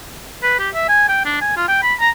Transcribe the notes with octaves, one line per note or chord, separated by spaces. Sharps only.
B4
G4
E5
G#5
G5
D4
G#5
F4
G5
B5
A#5